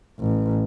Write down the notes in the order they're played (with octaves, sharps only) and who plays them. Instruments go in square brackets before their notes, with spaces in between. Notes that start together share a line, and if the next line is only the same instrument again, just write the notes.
[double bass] A1